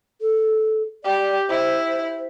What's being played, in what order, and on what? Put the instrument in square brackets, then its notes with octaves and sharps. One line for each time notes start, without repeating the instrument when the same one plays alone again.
[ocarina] A4
[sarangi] G4 [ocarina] D5
[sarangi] E4 [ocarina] C5